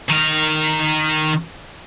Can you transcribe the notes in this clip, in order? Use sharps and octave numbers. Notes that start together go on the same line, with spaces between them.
D#3 A#4